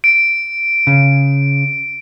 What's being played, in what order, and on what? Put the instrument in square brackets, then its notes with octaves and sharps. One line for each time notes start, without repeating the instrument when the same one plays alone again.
[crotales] D7
[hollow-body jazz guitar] C#3